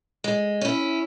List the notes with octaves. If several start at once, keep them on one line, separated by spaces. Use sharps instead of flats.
G#3
C#4 E4